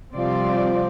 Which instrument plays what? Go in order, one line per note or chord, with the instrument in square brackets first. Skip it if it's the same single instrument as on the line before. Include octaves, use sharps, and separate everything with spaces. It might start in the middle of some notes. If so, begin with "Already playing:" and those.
[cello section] C3 G3 C4 F4 D5 [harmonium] F3